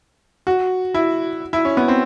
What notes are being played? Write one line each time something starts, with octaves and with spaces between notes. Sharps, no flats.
F#4
E4
E4
C#4
B3
C4